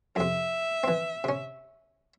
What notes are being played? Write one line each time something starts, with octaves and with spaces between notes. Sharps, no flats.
F2 C3 E5
E3 C4
C3 C#4